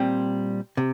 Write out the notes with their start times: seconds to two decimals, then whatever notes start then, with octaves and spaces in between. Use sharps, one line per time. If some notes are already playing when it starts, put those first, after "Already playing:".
Already playing: A#2 G3 C4 G5
0.77 C3